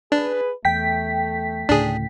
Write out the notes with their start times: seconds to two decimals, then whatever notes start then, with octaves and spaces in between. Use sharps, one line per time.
0.12 D4 G#4 B4
0.65 E2 A3 G5 B6
1.69 D2 A2 C#3 D4 G#4